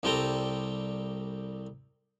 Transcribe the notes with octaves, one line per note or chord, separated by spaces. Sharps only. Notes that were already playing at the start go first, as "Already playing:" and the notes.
C2 G3 C4 A4 G5 A#5